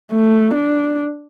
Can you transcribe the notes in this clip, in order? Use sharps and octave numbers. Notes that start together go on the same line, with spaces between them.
A3
D4